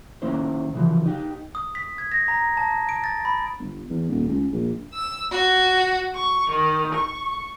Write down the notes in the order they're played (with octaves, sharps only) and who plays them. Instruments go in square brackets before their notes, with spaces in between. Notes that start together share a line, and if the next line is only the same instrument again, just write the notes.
[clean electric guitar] D#3 A#3 C#4 E4 C5
C#3 E3 F3
D#4 G4
[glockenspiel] D#6
B6
G#6
A#6
A#5
A5
D7
A6
B5
[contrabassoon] G1
E2
D#1
C#2
A#1
[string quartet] E6
F#4
C#6
D#3
C#6